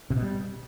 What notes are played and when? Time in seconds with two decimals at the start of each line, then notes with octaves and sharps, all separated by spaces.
0.10 C3
0.16 B2
0.22 G3